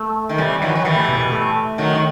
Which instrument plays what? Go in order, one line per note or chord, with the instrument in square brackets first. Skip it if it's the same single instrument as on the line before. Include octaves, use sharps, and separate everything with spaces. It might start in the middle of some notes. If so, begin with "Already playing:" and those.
Already playing: [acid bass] A3
[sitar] D#3
[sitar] C3 E3 [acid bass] G3
[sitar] D#3 F#3 [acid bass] E3
[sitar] F#3
[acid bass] D#3 [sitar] E3 G3
[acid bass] A3
B2
B2
A3
[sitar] D#3 F#3
D#3